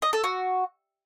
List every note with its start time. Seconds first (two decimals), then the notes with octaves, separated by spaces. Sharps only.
0.02 D#5
0.13 A4
0.24 F#4